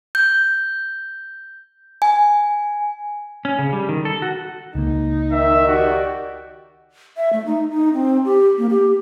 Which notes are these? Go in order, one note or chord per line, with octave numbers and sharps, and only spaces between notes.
G6
G#5
C#4
C#3
G3
D#3
A4
F#4
C#2 A#3 D#4
D#3 E5
F#4 G4 D5
E5
A3
D#4
D#4
C4
G4
A#3
G4